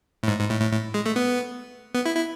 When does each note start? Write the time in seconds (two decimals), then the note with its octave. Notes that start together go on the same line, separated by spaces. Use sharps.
0.23 A2
0.28 G#2
0.39 G#2
0.50 A2
0.61 A2
0.71 A2
0.94 G#3
1.06 A3
1.16 B3
1.95 B3
2.06 E4
2.16 E4